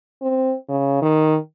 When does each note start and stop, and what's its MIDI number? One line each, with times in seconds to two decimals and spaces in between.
0.22 0.55 60
0.69 0.98 49
1.02 1.37 51